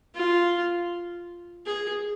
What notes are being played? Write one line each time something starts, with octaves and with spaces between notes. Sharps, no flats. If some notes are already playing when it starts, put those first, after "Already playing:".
F4
G#4